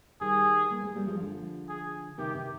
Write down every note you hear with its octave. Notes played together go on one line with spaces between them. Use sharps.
D#3 G3 G#4
G3 A#3
G#3 C4
G3 A#3
F3 G#3
D3 F3
G#4
C3 D#3 G4
C3 D#3